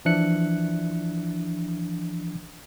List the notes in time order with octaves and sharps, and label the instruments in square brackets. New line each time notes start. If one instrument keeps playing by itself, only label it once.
[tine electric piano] E3 F3 D4 E5 F#6 C#7